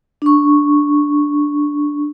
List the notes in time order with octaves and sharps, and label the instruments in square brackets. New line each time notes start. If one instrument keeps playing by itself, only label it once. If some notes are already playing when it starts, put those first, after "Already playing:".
[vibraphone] D4 C#6